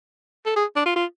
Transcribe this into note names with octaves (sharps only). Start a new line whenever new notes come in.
A4
G#4
D4
F4
F4